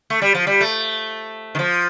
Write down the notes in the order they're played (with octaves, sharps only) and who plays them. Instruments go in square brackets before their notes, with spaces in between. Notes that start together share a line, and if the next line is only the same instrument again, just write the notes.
[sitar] A3
G3
F3
G3
A3
D#3
F3